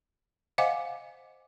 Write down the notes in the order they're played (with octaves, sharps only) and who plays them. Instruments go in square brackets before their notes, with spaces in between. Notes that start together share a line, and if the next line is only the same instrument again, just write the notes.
[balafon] C5 D#5 F5 F#5 G#5 D6